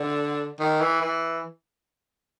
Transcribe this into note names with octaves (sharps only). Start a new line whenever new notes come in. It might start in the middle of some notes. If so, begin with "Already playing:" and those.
Already playing: D3
D#3
E3
E3